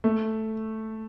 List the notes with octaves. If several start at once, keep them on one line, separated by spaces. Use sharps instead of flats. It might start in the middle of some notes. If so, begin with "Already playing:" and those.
A3